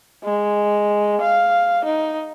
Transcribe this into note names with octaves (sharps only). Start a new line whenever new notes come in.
G#3
F5
D#4